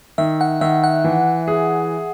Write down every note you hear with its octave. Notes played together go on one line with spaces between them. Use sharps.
D#3 E5
F#5
D#3 E5
F#5
E3
G#4